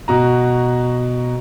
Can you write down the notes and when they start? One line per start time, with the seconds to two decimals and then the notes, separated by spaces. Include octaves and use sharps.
0.08 B2 F#4 A#5